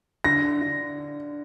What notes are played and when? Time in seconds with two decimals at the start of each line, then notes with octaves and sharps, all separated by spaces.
0.24 D3 A#6
0.62 D3